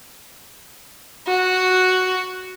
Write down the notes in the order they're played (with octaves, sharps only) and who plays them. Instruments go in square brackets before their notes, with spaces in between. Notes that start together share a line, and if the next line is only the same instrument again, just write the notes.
[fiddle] F#4